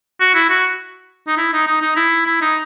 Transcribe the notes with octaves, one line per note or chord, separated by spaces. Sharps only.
F#4
E4
F#4
D#4
E4
D#4
D#4
D#4
E4
E4
D#4